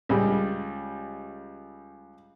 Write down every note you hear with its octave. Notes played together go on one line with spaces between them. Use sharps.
C#2 G3